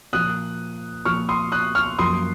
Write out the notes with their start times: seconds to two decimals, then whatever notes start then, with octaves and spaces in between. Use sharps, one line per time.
0.13 A#2 F3 A#3 D#6 F#6
1.05 A#2 F3 A#3 C#6 F6
1.29 C6 D#6
1.52 D#6 F#6
1.75 C#6 F6
1.99 F#2 F3 A#3 C6 D#6